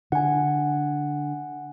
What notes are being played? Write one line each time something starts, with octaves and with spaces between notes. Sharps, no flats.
D3 F#5 G#5